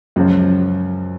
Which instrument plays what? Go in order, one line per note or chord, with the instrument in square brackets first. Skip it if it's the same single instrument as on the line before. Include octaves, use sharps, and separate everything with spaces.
[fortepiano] C#2 C#3 F3 [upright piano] F#2